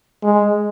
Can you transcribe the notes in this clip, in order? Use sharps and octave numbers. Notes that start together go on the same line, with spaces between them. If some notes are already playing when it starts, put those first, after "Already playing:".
G#3